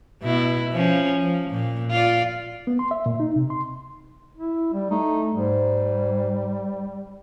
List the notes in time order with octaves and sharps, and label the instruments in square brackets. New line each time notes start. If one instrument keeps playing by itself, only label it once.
[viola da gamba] B2 E4
F3 C#4
F3
A#2
F4 D5
[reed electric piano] B3
C6
E5
A#2
D#4
C3
C6
[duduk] E4
G3
[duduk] A3 [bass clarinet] D#4
[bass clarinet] G#2 [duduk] G3